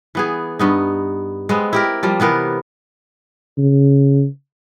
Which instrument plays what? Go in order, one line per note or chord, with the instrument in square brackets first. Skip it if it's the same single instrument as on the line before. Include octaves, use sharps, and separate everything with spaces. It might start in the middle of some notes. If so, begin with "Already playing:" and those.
[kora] E3 B3 G#4
G2 B3 D#4
G#3 B3 C4
E4 G4 A#4
F3 G3 A#3
C3 E3 B3 A#4
[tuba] C#3